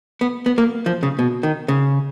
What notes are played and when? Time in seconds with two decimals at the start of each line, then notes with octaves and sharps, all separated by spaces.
0.21 B3
0.46 B3
0.58 A#3
0.86 F3
1.03 C#3
1.19 B2
1.43 D#3
1.68 C#3